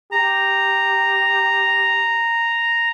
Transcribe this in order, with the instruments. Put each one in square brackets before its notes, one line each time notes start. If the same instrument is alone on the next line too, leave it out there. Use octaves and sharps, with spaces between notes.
[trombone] G4 [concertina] A#5